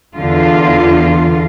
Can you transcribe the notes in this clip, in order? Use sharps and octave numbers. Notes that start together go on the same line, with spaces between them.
E2 D3 F4